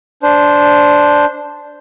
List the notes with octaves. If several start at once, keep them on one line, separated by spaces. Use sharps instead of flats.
D4 C5